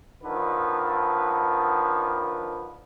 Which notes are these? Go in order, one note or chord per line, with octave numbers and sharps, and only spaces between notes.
D3 D#3 F3 B4